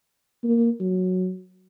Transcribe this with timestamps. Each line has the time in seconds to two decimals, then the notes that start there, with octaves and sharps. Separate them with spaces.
0.44 A#3
0.80 F#3